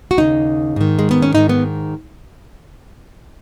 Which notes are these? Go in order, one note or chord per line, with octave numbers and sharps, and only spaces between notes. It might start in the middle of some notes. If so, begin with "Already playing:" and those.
F#4
D#2 C#3 D#4
G#2 D#3
G#3
B3
C#4
G#2 D#3 D#4
B3